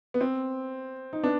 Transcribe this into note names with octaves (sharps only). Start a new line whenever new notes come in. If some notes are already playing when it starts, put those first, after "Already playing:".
B3
C4
D#4
B3 D4